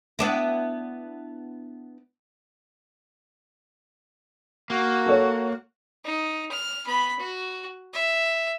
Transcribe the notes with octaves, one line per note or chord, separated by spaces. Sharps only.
B3 D4 E4
A#3 F#4
A4 C#5
D#4
F6
B3 B5
F#4
E5